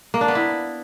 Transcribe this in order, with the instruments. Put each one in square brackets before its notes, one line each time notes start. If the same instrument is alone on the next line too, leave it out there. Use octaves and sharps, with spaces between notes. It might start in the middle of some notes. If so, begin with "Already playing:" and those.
[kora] A#3
D4
B3
E4